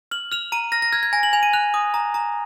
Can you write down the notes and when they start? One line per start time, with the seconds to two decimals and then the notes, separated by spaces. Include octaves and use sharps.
0.11 F6 F#7
0.32 F6 F7
0.52 A#5 D#7
0.72 F6 A#6
0.82 A#6
0.93 F6 G#6
1.03 G#6
1.13 G#5 A#6
1.23 F#7
1.33 G#5 F7
1.43 D#7
1.53 F#6 F7
1.74 D#6
1.94 A#5
2.14 A#5